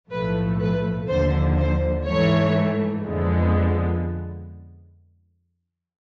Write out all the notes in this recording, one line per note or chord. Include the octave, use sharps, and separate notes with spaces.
B1 A2 F3 A3 B4
B4
D#2 D3 F3 C5
C5
G#2 E3 A3 C#5
F2 D3 F3 G#3 B3